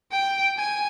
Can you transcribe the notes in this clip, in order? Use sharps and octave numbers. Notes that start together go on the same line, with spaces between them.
G5
G#5